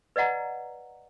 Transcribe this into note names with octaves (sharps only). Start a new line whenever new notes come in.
B4 D5 D#5 F#5 A#5